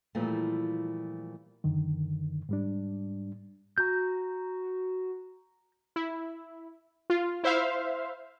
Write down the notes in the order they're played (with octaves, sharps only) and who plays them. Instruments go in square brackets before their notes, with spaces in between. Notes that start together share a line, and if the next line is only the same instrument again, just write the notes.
[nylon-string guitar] A#2 E3 F3 G3 A3
[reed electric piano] F#2 D3 D#3
G#2 G3 D4
[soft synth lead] F#4 [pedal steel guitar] A#5 G6
[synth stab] E4
F4
E4 C5 E5 F5